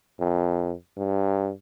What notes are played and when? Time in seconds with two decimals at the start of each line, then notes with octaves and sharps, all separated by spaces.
0.20 F2
0.97 G2